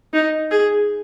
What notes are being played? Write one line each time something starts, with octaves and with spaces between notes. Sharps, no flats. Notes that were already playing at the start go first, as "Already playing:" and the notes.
D#4
G#4